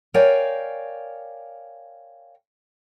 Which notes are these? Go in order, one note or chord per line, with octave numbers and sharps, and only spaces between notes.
A#4 C#5 D5 F5 G5 G#5